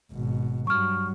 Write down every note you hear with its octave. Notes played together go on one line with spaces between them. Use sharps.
G#1 B2
G2 F#3 C#6 F6